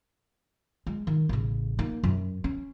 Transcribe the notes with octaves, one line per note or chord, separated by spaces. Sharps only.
G#3
D#3
A1 C#3
A#3 D#4
F#2
C#4